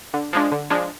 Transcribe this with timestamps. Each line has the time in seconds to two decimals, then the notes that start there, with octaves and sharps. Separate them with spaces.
0.14 D3
0.33 F3 G#3 D4
0.52 D3
0.70 F3 G#3 D4